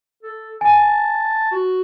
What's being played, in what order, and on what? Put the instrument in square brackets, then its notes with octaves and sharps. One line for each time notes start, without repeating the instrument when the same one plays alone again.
[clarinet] A4
[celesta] G#5 [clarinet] A5
[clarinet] F#4